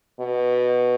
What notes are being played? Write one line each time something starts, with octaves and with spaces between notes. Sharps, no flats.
B2